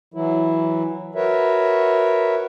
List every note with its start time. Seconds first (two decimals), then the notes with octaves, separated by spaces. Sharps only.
0.14 E3 F#3 E4
1.15 F#4 A#4 B4 C#5 E5